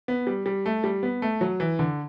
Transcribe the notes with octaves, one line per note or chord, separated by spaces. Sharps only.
B3
G3
G3
A3
G3
B3
A3
F#3
E3
D3